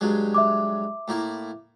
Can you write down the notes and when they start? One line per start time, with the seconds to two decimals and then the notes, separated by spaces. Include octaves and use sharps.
0.01 G2 F#3 G#3
0.34 E5 D6
1.08 A2 A#3 E4